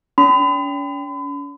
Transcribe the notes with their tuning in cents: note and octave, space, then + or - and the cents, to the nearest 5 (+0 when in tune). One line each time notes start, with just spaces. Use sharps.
C#4 +40 B5 +40